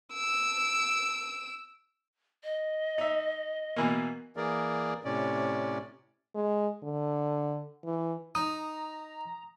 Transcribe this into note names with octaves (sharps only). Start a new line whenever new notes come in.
E6 D7
D#5
D#4 E5
B2 E3 A#3
E3 A#3 G#4 A#4 D5
A2 C3 C#4 D5
G#3
D3
E3
D#4 A#5 D#6